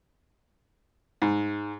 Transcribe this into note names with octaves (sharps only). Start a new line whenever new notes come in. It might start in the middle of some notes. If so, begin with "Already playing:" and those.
G#2